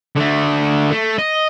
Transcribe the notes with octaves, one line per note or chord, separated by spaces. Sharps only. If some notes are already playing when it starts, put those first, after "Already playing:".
D3 A3
A3
D#5